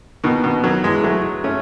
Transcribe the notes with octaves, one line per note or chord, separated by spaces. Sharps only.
B2 D#3
B2 D#3
D#3 F#3
E3 G#3
F#3 A3
A3 C#4